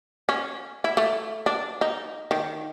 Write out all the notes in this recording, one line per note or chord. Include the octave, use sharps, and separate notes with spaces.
C#4
E4
A3
D4
D#4
D#3